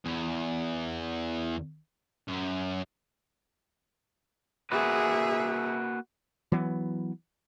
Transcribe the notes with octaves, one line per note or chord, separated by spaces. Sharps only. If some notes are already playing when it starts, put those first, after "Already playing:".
E2
F#2
A#3 F#4 G#4 B4 E5
E3 F#3 B3